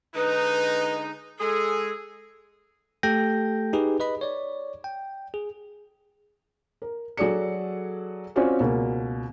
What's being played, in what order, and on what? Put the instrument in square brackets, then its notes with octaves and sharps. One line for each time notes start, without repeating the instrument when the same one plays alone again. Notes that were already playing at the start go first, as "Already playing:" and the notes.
[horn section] D3 G#3 D#4 [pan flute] B4
[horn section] G#3 G#4 [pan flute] A4
[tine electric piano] A3 G4 A4 G5 G6 A#6
D#4 G4 G#4 B4
B4 D#5 B5
C#5 D5
G5
G#4
[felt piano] A#4
F#3 F#4 G#4 A4 D5 C#7
C4 C#4 F4 F#4 C#5 D5
C#2 B2 A#3